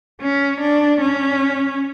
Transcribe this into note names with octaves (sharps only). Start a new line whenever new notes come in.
C#4
D4
C#4